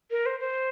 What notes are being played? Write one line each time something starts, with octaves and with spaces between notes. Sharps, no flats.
A#4
C5
C5